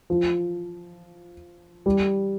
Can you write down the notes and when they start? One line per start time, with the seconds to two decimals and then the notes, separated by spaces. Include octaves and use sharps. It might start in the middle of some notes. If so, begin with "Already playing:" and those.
0.10 F3
1.86 G3